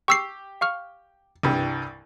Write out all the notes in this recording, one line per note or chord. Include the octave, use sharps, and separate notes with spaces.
G4 C#6 E6 C7
F5 C#6 F6
C2 G2 E3